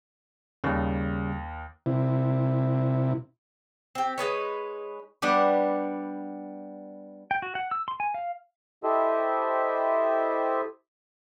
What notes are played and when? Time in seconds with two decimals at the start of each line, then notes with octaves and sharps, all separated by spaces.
0.64 D#2 C#3 G3
1.86 C3 E4
3.95 C4 G4
4.18 G#3 D#4 B4 C#5
5.22 G3 B3 D4 G4
7.31 G5
7.42 F#4
7.55 F#5
7.71 E6
7.88 C6
8.00 G#5
8.14 F5
8.84 E4 G4 A4 C5 D#5 E5